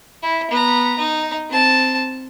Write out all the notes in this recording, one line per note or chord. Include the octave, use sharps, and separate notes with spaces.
E4
B3 A#5
D#4
C4 A5